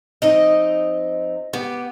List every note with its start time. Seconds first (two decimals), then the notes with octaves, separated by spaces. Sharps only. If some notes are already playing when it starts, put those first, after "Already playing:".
0.22 F2 C4 D#4 D#5
1.53 B3 G4